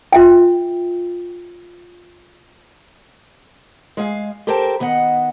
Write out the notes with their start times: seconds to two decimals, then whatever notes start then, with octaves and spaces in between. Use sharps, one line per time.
0.12 F4 E5 G5
3.97 G#3 G#4 F5
4.47 G4 A4 A#4 C5 G5 A5
4.80 D#3 B3 D#5 F#5